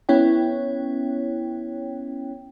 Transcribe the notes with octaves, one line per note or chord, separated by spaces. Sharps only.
B3 C#4 E4 C#5 G5